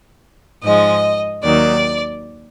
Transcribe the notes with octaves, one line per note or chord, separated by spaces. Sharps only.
G#2 F3 G#3 D#5
D#2 D#3 F#3 D5